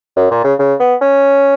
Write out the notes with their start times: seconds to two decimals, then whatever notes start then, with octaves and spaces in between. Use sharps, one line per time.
0.16 F#2
0.31 A#2
0.44 C#3
0.59 C#3
0.80 B3
1.02 C#4